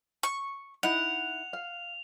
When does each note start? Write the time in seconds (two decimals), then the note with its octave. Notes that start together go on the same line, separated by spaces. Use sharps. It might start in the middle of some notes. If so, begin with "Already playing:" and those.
0.23 C#6
0.83 D#4 E4 F#5 F7
1.53 F5